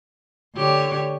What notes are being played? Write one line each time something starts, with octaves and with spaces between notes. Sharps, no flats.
D3 G4 C#5